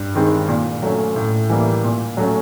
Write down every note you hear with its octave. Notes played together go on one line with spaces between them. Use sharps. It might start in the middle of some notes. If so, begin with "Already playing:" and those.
Already playing: G2
D#3 G#3 C4
A#2
F#3 A3 C#4
A2
E3 G3 A#3
A#2
F#3 A3 C#4